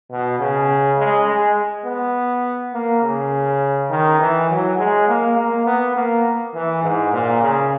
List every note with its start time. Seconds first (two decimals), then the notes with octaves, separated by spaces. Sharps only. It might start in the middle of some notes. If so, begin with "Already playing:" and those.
0.11 B2
0.40 C#3
0.98 G#3
1.27 G#3
1.86 B3
2.74 A#3
3.03 C#3
3.90 D#3
4.20 E3
4.50 F#3
4.79 G#3
5.08 A#3
5.37 A#3
5.66 B3
5.96 A#3
6.54 E3
6.83 G#2
7.13 A#2
7.42 C#3